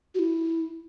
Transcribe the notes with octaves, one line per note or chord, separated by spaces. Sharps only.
F#4
E4